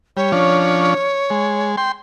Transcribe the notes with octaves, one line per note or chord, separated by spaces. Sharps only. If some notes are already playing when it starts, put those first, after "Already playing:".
G3 C#5
F3 C#4 D4
G#3
G5 C6